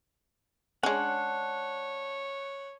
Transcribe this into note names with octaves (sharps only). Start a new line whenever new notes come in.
G#3 C#4 D4 C#5 F#5